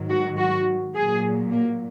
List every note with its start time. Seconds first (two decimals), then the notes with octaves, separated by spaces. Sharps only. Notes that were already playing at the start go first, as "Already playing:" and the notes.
Already playing: G#2 D#3 F#3
0.09 F#4
0.37 F#4
0.95 A#2 F#3 G#4
1.52 A#3